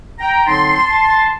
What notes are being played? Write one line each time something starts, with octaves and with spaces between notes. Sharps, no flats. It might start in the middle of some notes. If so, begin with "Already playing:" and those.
G5 A#5
D3 F#3 C4 D#4 A5 C6
A5 C6
C6